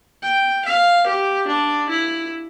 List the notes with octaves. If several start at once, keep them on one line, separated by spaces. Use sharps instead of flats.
G5
F5
G4
D4
E4